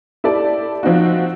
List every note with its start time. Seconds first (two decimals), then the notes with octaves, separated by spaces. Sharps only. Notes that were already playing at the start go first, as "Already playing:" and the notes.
0.24 E4 G4 A4 D5
0.83 F3 C4 D#4 F#4